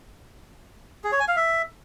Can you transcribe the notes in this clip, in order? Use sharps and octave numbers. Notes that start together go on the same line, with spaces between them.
G#4
C#5
G#5
F5
E5